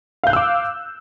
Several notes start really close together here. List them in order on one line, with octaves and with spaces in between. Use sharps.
F5 G6 F#6 E6 D6